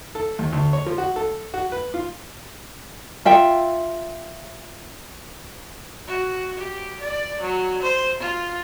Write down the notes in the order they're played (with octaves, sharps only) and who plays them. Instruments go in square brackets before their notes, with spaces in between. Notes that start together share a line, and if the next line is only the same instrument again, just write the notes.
[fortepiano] A4
D#2
D2
C#5
F3
F#4
A4
F#4
B4
F4
[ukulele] F4 E5 G5
[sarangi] F#4
G4
D5
F#3
C5
F4